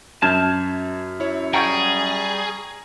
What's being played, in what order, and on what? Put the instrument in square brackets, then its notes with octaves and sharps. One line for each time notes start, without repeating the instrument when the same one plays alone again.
[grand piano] F#2 [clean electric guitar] A5 [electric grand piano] F6 G6 G#6
[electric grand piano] E4 C#5
[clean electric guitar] G3 F#5 G5 [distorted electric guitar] G#4 [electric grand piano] A#5 C#6 G#6